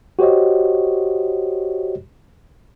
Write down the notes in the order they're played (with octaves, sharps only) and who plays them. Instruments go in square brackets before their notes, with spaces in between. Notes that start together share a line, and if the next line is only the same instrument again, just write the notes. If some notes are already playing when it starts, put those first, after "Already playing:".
[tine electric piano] F#4 G4 C5 C#5 D#5